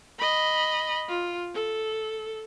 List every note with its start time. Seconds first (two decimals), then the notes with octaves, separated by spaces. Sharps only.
0.19 D#5 B5
1.09 F4
1.54 A4